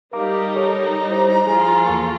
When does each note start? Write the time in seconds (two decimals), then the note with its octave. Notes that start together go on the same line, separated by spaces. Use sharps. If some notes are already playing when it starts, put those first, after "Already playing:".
0.13 G3 D#4 G4 A#4 F5 A#5 D6
0.56 A4 C#5 A#5
1.10 E4 C5
1.46 F3 F4 G#4
1.86 E2 A#3 A4 C#6